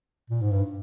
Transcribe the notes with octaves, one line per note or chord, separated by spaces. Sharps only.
A#2
G#2
G2